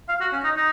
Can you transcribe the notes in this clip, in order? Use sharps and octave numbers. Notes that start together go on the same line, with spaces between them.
F5
F#4
C#4
D#4
D#4